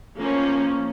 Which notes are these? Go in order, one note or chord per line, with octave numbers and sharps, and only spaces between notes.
F3 A#3 C#4